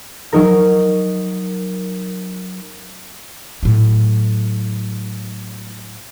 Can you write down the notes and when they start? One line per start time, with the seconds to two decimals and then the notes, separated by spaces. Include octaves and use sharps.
0.33 F#3 D#4 A#4
3.63 A2 F#3